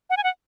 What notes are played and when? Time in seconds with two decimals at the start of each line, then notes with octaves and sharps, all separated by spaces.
0.10 F#5
0.17 G#5
0.24 F#5